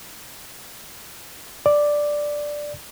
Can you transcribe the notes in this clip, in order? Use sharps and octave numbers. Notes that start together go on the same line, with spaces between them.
D5